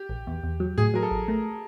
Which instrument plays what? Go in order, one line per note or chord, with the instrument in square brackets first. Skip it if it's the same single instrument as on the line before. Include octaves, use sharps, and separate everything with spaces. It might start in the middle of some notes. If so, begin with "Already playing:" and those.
Already playing: [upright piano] G4
[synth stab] A#1
E2
E2
F#3
[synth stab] A2 [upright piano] G#4
[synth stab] F#3 [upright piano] A#4
[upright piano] A4
[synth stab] A1
[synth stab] A3 [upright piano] A#4